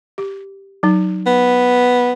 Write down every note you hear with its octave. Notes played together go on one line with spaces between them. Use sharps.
G4
F#3 D#4
B3